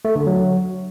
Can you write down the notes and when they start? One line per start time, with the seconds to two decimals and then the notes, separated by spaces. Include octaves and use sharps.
0.05 A3
0.16 D3
0.27 F#3